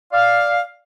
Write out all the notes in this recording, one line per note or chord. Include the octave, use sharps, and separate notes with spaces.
D5 F5